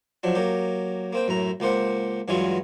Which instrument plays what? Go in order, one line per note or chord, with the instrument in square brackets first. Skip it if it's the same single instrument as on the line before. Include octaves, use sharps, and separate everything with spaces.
[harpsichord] F3 F#3 D4
F#3 A#3 G4
A#3 C4 G5
F#2 A2 A#5
C#2 A#3 G4 C5 F#5
G2 E3 F#3 G#3 F4 F#4